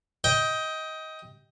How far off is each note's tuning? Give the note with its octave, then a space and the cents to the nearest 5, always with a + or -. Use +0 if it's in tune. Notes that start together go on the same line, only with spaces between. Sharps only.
D#5 +20 G5 +0